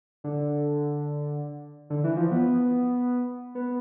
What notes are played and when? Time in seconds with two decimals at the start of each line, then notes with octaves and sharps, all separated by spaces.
0.24 D3
1.90 D3
2.04 E3
2.17 F3
2.31 B3
3.55 B3